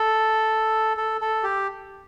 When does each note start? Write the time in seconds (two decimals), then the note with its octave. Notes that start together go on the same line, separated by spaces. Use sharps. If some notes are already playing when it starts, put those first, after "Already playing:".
Already playing: A4
0.97 A4
1.21 A4
1.43 G4